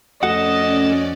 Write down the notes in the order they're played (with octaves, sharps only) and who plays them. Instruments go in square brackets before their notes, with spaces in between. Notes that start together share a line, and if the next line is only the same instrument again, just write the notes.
[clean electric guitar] F2 F#4 F#5 [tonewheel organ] A3 A4 [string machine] C#4 D5 [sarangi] D#5